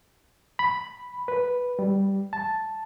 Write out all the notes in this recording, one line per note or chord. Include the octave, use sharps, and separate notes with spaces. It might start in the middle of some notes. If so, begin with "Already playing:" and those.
B5
B4
G3
A5